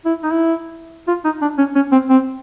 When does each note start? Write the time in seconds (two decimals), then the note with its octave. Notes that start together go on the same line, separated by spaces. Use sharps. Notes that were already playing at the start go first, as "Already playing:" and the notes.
0.05 E4
0.23 D#4
0.31 E4
1.08 F4
1.25 D#4
1.42 D4
1.58 C#4
1.76 C#4
1.92 C4
2.09 C4